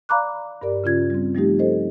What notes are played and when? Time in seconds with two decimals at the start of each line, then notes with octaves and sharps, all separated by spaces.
0.09 D5 F5 A#5 B5 D6 F#6
0.61 G2 G4 A#4 D5
0.84 C#3 C#4 F4 G#6
1.10 G3 C4
1.35 F3 G3 A3 D#4 G4
1.59 G4 A4 C5 D#5